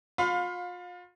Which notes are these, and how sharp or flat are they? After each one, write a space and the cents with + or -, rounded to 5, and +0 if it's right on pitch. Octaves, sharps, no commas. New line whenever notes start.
F4 +35 F5 +25 B5 +35